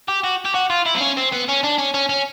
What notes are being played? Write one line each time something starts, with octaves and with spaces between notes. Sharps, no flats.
G4
F#4
G4
F#4
F4
E4
C4
C#4
C4
B3
C#4
D4
C#4
C#4
C#4